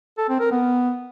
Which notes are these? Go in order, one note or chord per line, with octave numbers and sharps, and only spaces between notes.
A4
C4
A#4
B3